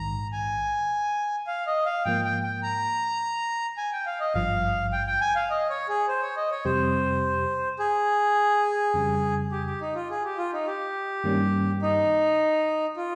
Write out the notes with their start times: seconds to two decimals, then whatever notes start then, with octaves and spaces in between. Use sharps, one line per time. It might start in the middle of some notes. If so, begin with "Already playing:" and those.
Already playing: A#1 G#2 D#3 A#5
0.32 G#5
1.47 F5
1.67 D#5
1.86 F5
2.05 G#2 F3 A#3 G5
2.25 G5
2.43 G5
2.63 A#5
3.78 G#5
3.92 G5
4.06 F5
4.20 D#5
4.34 G#1 G2 F3 F5
4.93 G5
5.07 G5
5.21 G#5
5.36 F5
5.50 D#5
5.70 C#5
5.89 G#4
6.08 C5
6.22 C#5
6.37 D#5
6.51 C#5
6.65 F2 C3 G3 C4 G4 C5
7.79 G#4
8.94 F2 C#3 G3
9.51 G4
9.66 G4
9.81 D#4
9.95 F4
10.10 G#4
10.25 G4
10.38 F4
10.53 D#4
10.67 G4
11.24 G2 D#3 G3 A#3 C#4
11.82 D#4
12.97 F4